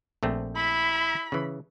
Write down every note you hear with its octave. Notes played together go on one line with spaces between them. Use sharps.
A#1 A3 C4
E4 B5
C#3 E3